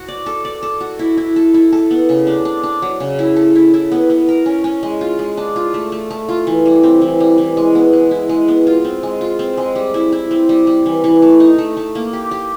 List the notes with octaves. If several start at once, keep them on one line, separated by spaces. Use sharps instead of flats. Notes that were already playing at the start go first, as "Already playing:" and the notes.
Already playing: F#4
D5
A4
D5
A4
F#4
E4
E4
A4
E4
A4
B3
C#3
D4
D4
D4
F#3
C#3
E4
A4
E4
E4
B3
B3
A#4
C#4
C#4
G#3
F4
G#3
D4
F4
A3
A3
A3
F4
E3
G3
C4
E3
G3
E3
G#3
B3
G#3
E4
G#3
B3
F4
C4
G#3
F4
C4
G#3
G3
E4
E4
C4
G3
G3
E3
E3
A3
D#4
A3
A3
A#3
G4
G4